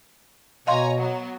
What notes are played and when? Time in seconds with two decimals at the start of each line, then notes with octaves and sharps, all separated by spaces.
0.67 B2 C#5 D#5 F5 G#5 A#5 C6
0.97 F#3 B3